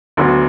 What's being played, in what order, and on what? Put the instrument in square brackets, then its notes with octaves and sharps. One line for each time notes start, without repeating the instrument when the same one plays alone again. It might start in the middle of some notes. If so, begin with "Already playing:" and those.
[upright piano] D2 D3 F#3 B3 F#4